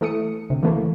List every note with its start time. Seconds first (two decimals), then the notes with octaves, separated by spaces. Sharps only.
0.01 E3 A3 D#6 C#7
0.50 D2 C3
0.63 E3 A3 A#3